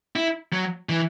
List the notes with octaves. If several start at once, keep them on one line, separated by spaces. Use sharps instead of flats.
E4
F#3
E3